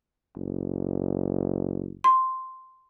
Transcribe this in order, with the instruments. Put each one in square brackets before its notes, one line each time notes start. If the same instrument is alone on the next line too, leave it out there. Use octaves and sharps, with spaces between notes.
[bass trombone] F#1
[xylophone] C6